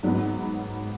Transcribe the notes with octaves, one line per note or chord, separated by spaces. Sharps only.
G#2 F#3 B3